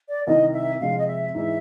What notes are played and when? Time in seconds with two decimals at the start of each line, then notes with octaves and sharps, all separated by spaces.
0.08 D5
0.27 C2 C3 D#3 D#5
0.53 E5
0.80 C3 F3 G#3 C4 F5
0.98 D#5
1.07 E5
1.35 G#2 E3 G#3 E5